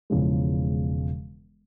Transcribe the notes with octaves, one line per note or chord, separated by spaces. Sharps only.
E1 E2 C#3 F3 G#3